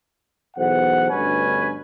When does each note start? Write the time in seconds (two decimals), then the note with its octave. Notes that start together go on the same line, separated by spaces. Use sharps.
0.57 B1 E2 C5 F#5
1.10 D2 G2 B2 C#4 B4 G#5